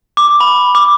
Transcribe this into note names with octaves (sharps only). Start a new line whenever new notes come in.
D6
B5
D6